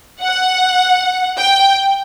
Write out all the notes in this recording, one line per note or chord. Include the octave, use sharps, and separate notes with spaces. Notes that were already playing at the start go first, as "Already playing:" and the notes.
F#5
G5